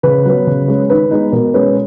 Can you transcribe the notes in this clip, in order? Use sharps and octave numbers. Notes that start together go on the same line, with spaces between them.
C#3 B4
F#3 B3
C#3
G#3 C#4
D#3 B4
G#3 B3 D#4
B2 A#4
G#3 C#4 B4